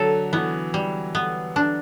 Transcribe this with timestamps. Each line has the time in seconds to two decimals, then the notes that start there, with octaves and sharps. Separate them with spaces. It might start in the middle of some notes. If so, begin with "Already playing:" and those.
Already playing: D3 F#3 A4
0.33 E3 B3
0.74 G3
1.15 B3
1.56 D4